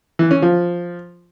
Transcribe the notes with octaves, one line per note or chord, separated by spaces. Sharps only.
E3
C#4
F3